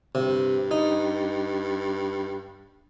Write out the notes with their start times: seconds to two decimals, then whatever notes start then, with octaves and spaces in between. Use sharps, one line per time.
0.15 G2 C3
0.71 D#4